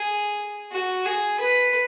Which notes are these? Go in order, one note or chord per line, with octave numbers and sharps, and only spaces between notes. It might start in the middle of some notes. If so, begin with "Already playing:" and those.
Already playing: G#4
F#4
G#4
B4